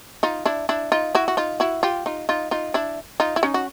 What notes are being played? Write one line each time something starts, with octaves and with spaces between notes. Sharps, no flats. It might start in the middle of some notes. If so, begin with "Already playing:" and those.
D#4 F4
D4 E4
D4 E4
D#4 F4
E4 F#4
F#4
D#4 F4
E4 F#4
F4 G4
D#4 F4
D#4 F4
D#4 F4
D4 E4
D#4 F4
E4
C#4 D#4
F#4